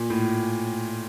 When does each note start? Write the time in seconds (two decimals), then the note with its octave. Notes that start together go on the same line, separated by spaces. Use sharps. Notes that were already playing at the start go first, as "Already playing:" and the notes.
Already playing: A#2
0.10 A2